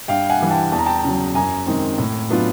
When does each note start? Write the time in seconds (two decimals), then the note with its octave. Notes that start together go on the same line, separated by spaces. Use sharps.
0.08 G2 F5 G5
0.30 F#5 G#5
0.40 E3 G3
0.50 G5 A5
0.72 E2 A5
0.79 A#5
0.86 G5 A5
1.04 C#3 F#3
1.35 F#2 G#5 A#5
1.66 D#3 G#3 C4
1.98 A2
2.30 F#3 B3 D4 F4